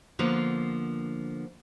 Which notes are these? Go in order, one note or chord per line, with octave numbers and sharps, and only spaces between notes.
D3 F3 A#3 B3